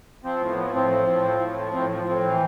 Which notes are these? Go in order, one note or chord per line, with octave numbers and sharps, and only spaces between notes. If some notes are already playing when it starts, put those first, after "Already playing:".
F3 C4
A2
B3
F3
A2 C4
F3
A2
F3
A2
F3
A2 C4
F3
A2 C4
E3